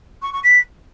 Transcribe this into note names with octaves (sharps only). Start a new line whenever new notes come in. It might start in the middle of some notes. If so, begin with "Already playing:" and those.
C#6
C#6
B6